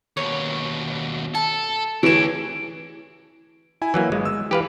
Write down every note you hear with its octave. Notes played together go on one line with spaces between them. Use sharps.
D#2 B2 C#5
A4 A5
D2 E3 G#4 C#5 D7 E7
E4 G#5
E3 F#3 A#3
G1 G#3
E6
E3 G4 B4 F5